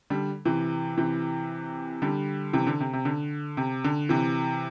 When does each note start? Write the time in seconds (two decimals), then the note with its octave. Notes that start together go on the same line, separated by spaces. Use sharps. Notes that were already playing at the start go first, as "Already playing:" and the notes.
0.10 D3 G3
0.45 C3 E3
0.98 C3 E3
2.02 D3 G3
2.53 C3 E3
2.67 D3
2.80 C3
2.93 C3
3.05 D3
3.57 C3
3.84 D3
4.09 C3 E3